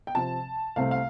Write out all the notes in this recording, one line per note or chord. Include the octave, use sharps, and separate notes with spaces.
G5
C3 F3 C4 A5
C2 C3 A3 C4 F5
F5